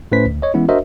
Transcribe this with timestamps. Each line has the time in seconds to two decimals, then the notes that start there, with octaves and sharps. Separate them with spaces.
0.12 A2 A3 C#4 B4 C5 B6
0.26 D2
0.42 C#5 D#5
0.54 E3 G#3 B3 C#4 E4
0.68 D4 F#4 A#4 C5 D#5 E5